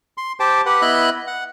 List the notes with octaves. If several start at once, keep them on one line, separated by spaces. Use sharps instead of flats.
C6
G4 C5 G5 A5
G4 B4 F#5
B3 E4 D#5 E5 B5 F#6
F#5